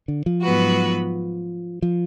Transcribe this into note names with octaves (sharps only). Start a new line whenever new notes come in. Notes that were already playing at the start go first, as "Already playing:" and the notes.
D3
F3
G#2 F#3 B3 F#4 B4
F3